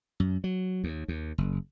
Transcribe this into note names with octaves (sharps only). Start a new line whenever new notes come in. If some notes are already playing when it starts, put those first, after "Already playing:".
F#2
F#3
D#2
D#2
F#1